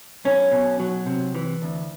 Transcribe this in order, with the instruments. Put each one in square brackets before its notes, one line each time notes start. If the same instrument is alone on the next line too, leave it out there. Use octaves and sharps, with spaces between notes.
[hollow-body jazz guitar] B1 C#4
B2
F#3
C3
E3
D2